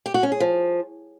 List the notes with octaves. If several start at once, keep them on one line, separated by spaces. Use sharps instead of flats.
G4
F#4
C#4
G#4
F3